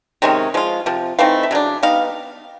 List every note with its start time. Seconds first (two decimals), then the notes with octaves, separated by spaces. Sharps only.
0.22 C3 D#3 G#3 C#4
0.54 F3 G#3 F4
0.86 C3 F3
1.19 E3 A3 C4 D#4 F5
1.43 E5
1.51 C#3 F#3 D4
1.83 G3 B3 D#4 F5